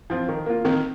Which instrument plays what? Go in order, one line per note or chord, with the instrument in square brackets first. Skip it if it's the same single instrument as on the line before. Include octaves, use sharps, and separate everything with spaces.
[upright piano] F3 C4 F4
D#3
A#3 F4
[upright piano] D#3 [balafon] C4